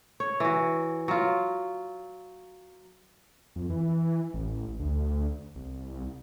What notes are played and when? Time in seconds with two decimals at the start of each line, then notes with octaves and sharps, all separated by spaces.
0.20 C#5
0.40 E3 F#4
1.08 F#3 F4
3.56 F2
3.70 E3
4.34 A1
4.79 D2
5.56 C2